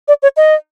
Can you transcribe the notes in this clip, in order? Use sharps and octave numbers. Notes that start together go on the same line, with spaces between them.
D5
C#5
D#5